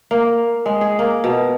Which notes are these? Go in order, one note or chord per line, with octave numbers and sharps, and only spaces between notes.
A#3
G#3
G#4
A#3
B2